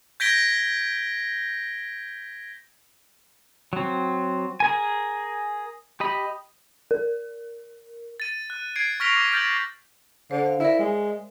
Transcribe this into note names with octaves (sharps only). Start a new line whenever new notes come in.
G6 G#6 A#6 B6 D7 G7
F#3 C4
G#4 A#4 G#5
G4 D#5 B5
A#4
A6 D#7
F#6
G#6 C7 D7
C#6 F6 A#6 B6 D7 F7
D6
F6 G6 A6 B6 F#7
D3 C5
F5
E4 A#4 D5 E5
G#3